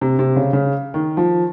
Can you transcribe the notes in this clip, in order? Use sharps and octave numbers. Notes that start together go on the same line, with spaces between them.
C3
C3
C#3
C#3
D#3
F3